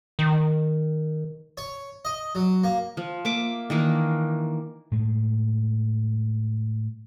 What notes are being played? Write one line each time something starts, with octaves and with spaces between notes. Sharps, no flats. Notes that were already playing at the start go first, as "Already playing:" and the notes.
D#3
C#5
D#5
F#3
A#3
F3
A#3 E5 D6
D#3 E3 A#3 D4
A2 G#3